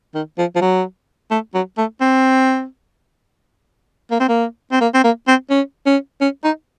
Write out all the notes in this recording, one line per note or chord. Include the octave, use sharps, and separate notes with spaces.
D#3
F3
F3
F#3
A3
F#3
A3
C4
A#3
C4
A#3
C4
A#3
C4
A#3
C4
C#4
C#4
C#4
D#4